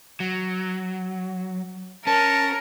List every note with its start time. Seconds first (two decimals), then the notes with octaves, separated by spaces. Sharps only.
0.20 F#3
2.07 C#4 A#4 A5